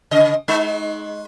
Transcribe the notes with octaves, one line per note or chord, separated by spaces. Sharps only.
C#3 D#5
G#3 D#4